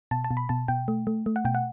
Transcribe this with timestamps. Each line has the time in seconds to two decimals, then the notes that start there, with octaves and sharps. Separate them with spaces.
0.11 B2 A5
0.24 A5
0.31 B2
0.37 B5
0.49 B2 A5
0.68 B2 G5
0.88 A3
1.07 A3
1.26 A3
1.36 F#5
1.45 B2 G5
1.55 F#5